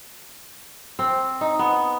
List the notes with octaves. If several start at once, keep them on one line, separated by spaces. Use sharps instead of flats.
C4
D#4
B3